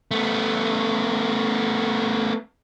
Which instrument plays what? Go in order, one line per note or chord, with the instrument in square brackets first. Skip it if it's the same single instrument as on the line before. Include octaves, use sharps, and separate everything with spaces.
[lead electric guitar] A3 B3